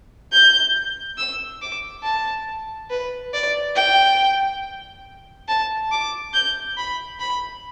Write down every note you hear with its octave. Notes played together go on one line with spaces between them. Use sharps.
G6
E6
D6
A5
B4
D5
G5
A5
D6
G6
B5
B5